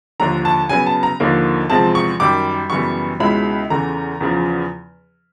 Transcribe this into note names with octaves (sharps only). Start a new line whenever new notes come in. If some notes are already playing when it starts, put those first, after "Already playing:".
D#2 D3 F3 A#5
A5
C#3 F#3 B3 G#5
A5
A#5
D#2 D3 F3 A#3 D#4
E2 C3 F3 G#3 C4 A5
C#6
F#2 D#3 G3 D6
F#2 C#3 E3 G3 B3 C#6
C#2 B2 G#3 C#4 E4 B5
E2 C#3 E3 A3 A#5
E2 C#3 F3